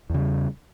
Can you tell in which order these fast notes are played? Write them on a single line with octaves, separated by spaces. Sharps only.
E2 C#3 G3